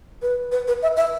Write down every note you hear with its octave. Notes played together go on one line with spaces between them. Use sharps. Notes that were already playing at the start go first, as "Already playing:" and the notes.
B4
B4
B4
E5
E5